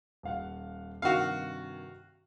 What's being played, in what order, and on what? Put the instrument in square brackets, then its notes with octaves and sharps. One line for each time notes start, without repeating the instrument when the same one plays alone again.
[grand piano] D#1 F5 F#5
[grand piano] G2 C3 D#3 [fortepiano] F#4 F5